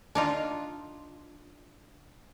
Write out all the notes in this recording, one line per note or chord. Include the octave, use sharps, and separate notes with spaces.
D4 D#4 F4